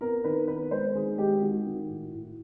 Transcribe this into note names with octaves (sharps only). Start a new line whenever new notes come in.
B3 A#4
D#3 B4
B3 B4
G#3 C5
D#3 G#4
G#3 G4
D#3 F#4
D#3
A2
A2